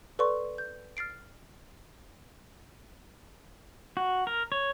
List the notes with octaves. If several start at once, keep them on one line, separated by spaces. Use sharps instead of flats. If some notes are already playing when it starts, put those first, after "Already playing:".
A4 B4 D5 C6 C#6
G6
F6 A6 C7 D7
F#4
A#4
C#5